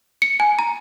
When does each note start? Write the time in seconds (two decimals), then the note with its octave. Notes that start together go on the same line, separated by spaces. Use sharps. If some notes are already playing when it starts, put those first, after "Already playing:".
0.22 C#7
0.40 G#5
0.59 A#5